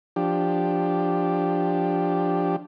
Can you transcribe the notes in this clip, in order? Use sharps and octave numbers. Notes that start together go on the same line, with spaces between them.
F3 D4 G4